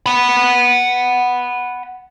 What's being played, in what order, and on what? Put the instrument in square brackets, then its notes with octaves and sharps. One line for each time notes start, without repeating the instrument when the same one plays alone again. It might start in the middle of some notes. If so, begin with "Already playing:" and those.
[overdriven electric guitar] F#5 B5